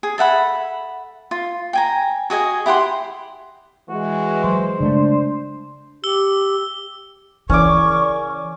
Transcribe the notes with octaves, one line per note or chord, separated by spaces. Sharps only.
G#4
A4 E5 F#5 B5
F4
G5 G#5 A#5
F#4 G#4 D#5 G#5
E4 G4 F#5 C6
E3 G#3 F#4
F#3 C5
C#3 G#3 A3 D4
G4 E6 G7
C#3 E3 C#4 A#4 D5 C#6 D6